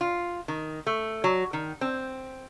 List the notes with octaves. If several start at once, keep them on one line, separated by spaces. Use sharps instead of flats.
F4
D#3
A3
F#3
D#3
C4